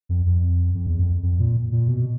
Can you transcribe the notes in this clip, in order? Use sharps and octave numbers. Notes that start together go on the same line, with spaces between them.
F2
F2
F2
E2
F2
F2
A#2
A#2
B2